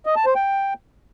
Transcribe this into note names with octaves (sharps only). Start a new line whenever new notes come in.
D#5
A5
C5
G5